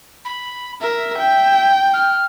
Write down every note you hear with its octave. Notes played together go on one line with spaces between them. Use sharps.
B5
A#4 E5
G5
F6